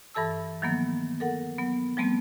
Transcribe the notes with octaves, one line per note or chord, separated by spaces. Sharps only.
G2 E3 A4 A5 E6
D#3 F3 F#3 A#3 B3
A4 A#4 F#5
F#3 B3
F3 G3 A3 B3 C4